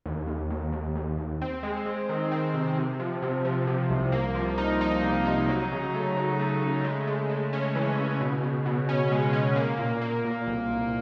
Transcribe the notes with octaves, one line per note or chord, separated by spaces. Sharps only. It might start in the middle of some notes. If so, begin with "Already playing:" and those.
D#2
D#2
D#2
D#2
D#2
D#2
C4
G#3
G#3
D#3
C4
C3
C3
F3
C3
F3
C3
C2
A#3
F3
D#4
D#4
C3
D#4
F#3
C#3
A3
F#3
A3
C#3
G#3
G#3
G#3
C#4
E3
C#3
B2
B2
B2
C#4
G#3
C#4
A#3
A#2
A#3
A#2
C2
C2